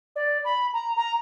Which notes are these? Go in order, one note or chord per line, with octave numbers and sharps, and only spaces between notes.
D5
B5
A#5
A#5